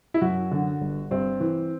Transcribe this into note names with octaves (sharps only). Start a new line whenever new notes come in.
E4
F#2 F#4
D3
G1
G2 C4
E3